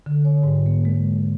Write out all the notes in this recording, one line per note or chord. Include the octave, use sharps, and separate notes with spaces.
D3
C#5
G#2
A#3
G#3